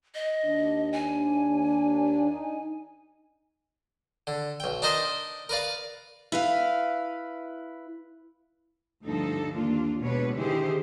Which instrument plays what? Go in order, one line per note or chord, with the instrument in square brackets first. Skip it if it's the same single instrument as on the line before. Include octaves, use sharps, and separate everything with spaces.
[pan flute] D#5
[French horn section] D#2 D4
[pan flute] G#5
[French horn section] D#4
[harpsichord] D3
B1 G5
D4 D#4 A#4 C5 D#5
A#4 B4 D5 F5
[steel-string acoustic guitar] E4 B4 F5
[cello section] D2 G2 D3 F3 D#4 A4
D#2 A#3 D4 F4
B2 G#3 D4 B4 C#5
D3 D#3 E4 G4 G#4 C5